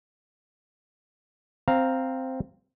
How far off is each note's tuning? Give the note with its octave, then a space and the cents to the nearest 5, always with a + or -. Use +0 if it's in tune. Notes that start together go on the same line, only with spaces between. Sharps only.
C4 +0 F5 +0 A#5 +0